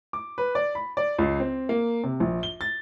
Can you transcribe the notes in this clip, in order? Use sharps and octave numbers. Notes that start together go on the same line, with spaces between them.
D6
B4
D5
B5
D5
C#2
C4
A#3
C3
A#1
G7
A6